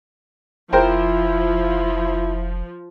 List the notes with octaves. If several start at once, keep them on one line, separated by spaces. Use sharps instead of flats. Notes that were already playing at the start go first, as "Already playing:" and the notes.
F1 F3 E4 A#4 C5 G5